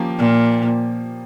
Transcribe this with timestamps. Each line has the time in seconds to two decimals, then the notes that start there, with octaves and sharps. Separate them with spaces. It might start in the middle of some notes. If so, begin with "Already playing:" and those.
Already playing: F3 A#3 C#4 G4
0.19 A#2